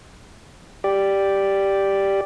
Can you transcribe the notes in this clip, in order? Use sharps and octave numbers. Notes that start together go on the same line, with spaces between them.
G4 D5